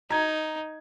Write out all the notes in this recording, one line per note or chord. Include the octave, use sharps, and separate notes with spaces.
D#4 A#5 G#6